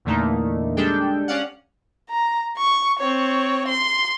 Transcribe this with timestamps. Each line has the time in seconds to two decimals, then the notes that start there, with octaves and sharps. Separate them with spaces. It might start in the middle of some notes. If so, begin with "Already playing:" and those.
0.05 E2 A#2 D3 A3 A#3 D#4
0.77 G3 G#3 D4 G4 A4 G5
1.28 C#4 D5 F5 F#5
2.10 A#5
2.57 C#6
2.99 C4 C#5
3.68 C6